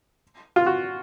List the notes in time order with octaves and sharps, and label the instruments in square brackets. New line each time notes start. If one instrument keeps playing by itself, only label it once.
[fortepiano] F4
F#4